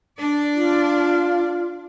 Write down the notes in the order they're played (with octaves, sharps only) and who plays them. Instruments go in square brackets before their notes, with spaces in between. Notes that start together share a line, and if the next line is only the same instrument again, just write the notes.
[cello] D4 D5
[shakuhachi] F4